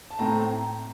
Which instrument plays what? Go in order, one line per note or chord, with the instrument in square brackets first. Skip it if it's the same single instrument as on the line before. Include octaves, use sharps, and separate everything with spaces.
[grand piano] A5
A2 A3 C4 A#5